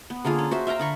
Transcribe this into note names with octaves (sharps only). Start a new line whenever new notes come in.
B3
D3 A#3 F4 G#4
C#4
F#4 C5 E5
E5 F5 G5 A#5
D3 B5 C#6